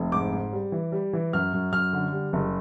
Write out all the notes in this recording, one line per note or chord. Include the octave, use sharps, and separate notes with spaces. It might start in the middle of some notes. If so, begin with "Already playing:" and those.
Already playing: F1
G#2 D6
G#2
G3
E3
G3
E3
F#2 F6
F#2
F#2 F6
D3
G3
F#1